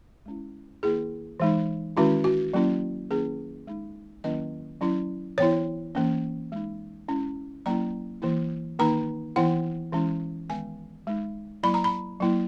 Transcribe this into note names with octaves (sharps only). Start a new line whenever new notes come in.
G#3 C#4 E4
D#3 A#3 E4 G#4
E3 G#3 D#4
D#3 G#3 C#4 E4 F#4
F#4
F#3 A#3 C#4 E4
D#3 A#3 C#4 E4 G#4
G#3 D#4
D#3 F#3 A#3 C#4 E4 D#5
F#3 C#4 E4
E3 B3 E4 C#5
E3 A#3 C#4
G#3 D#4
G#3 C#4 E4
F#3 A#3 C#4 E4 A#5
E3 A#3 E4
D#3 A#3 D#4 A#5
E3 B3 E4 F#5
E3 G#3 C#4 E4
D#3 G#3 B3 G#5
G#3 D#4
F#3 A#3 E4 B5
A#5
B5
F#3 A#3 E4